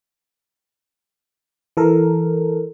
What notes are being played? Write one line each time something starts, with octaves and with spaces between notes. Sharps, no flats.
E3 A4 A#4